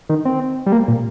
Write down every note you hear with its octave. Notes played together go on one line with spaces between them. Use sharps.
D#3
C4
G3
A#3
A#2